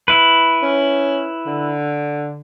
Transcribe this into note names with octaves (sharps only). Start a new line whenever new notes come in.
E4 B4
C#4
D3